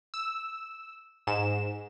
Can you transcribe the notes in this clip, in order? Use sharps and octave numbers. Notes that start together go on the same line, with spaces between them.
E6
G#2 E7